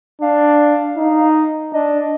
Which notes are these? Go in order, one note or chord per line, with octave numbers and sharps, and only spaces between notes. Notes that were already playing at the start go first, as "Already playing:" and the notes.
D4 F5
D#4
D4 D#5